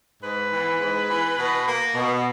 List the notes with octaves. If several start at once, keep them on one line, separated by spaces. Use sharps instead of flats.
G#2 B4
E3 B3
G#2
E3 B3
B2
A#3
B2